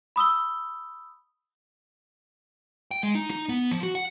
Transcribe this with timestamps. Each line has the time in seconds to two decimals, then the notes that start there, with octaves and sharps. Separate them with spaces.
0.16 B5 D#6 E6 G7
2.91 G5
3.03 G#3
3.15 D#4
3.30 D#4
3.49 B3
3.71 F3
3.83 F#4
3.95 F#5